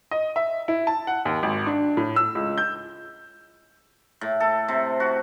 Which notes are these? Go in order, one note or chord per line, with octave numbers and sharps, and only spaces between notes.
D#5
E5
E4
A5
F#5
D#2
G#1
D4
A2
E6
C#2
G6
A2
A4
C3
F#4